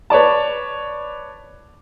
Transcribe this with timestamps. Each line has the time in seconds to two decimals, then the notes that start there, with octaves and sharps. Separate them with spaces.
0.10 B4 C#5 D5 A5